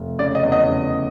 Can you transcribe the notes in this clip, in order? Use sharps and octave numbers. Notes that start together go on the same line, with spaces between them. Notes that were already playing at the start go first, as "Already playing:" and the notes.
Already playing: F1
C#3 D5
D#5
E2
D#5
C#3